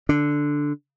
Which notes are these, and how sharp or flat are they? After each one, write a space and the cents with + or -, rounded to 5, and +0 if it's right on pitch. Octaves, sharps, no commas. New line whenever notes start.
D3 +0 D4 +0